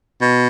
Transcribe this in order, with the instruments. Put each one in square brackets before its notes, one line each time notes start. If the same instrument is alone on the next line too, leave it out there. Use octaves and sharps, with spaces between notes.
[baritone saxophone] B2